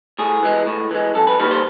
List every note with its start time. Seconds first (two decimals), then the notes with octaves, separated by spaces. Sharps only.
0.19 A2 G#4
0.43 E3 G#3
0.66 A2
0.91 E3 G#3
1.15 F#2 A4
1.27 B4
1.39 D#3 G3 A#3 B4
1.51 C5